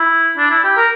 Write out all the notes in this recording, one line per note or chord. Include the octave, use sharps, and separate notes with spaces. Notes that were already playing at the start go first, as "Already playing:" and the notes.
Already playing: E4
D4
E4
G4
A#4